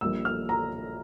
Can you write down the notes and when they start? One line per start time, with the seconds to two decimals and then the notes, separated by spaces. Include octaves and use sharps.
0.01 A#1 A#2 G3 A#3 E6
0.25 F6
0.49 A#5